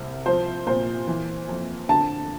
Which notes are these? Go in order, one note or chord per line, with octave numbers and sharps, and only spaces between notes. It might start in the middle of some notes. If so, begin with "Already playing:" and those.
Already playing: C2 C3
F3 C5
A#2 C5
E3
F2
D3 A5